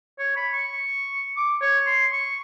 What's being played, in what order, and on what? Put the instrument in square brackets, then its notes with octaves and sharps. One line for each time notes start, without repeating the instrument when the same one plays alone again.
[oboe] C#5
B5
C#6
D6
C#5
C6
C#6